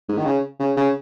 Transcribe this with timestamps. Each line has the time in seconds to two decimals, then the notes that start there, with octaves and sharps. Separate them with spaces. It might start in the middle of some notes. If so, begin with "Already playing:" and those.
0.09 G#2
0.18 D#3
0.26 C#3
0.60 C#3
0.76 C#3